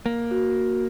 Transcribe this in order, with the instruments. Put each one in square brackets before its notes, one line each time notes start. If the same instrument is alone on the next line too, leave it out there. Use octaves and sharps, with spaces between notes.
[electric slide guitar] A#3
[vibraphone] F#4